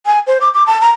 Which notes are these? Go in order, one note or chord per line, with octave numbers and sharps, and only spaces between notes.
G#5
C5
D6
D6
A5
A#5